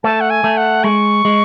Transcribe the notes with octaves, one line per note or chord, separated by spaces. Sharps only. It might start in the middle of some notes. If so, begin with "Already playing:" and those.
A3 A5
F#5
G#5
A3
F#5
G#3 C#6
G#3